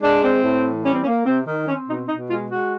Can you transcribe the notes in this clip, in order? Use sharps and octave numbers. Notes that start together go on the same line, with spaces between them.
G#3 D4
C4
A2
E3
G3 C#4
C4
C#4
A#3
C3 C4
D#3
C4 C#4
B2 D#4
B2 D#4
G#3 F4
G#3 F#4